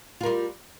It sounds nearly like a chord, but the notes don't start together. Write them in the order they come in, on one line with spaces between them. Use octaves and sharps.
F4 A#4 G3